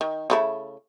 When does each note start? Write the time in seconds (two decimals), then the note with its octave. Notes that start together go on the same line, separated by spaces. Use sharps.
0.01 D#3
0.30 C#3 A3 E4